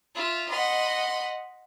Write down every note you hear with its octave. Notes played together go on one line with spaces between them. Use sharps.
F4 E5
D#5 F#5 B5 C6